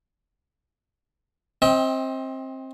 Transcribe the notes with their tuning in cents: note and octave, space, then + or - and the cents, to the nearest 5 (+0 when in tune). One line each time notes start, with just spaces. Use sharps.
C4 +20 D#5 +35 G5 +0